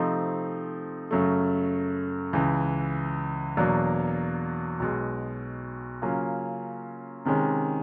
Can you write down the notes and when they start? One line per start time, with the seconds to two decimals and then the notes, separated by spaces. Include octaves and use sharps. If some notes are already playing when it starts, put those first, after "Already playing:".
Already playing: C3 F3 A3 C4 D#4
1.11 F#2 C#3 F#3 A3
2.33 C#2 C#3 E3
3.57 E2 B2 F#3 A#3 D4
4.80 B1 B2 G#3
6.02 C#3 F#3 A#3 C#4 F4
7.25 C3 D#3 G#3 C#4